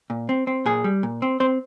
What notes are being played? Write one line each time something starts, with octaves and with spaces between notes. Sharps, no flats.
A#2
C4
C4
A#2 G#4
G3
A#2
C4
C4 C5